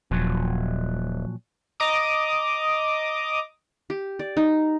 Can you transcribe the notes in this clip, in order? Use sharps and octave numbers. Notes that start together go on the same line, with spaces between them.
D#1 A#2 F3 F#3
D#5 A#5 D6 D#6
G4
D5
D#4